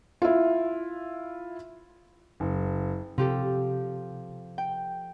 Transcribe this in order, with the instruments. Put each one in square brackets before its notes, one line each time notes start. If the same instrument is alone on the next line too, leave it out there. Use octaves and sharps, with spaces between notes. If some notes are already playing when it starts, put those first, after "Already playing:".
[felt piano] E4 F4
[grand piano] F#1
[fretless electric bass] C3 [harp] F3 G4 A4
[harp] G5